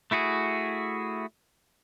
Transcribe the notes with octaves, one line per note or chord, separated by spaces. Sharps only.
A3 E4 F#4 G#4